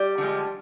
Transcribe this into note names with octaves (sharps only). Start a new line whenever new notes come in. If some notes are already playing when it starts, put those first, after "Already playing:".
Already playing: G3 G4
D3 F3 G#3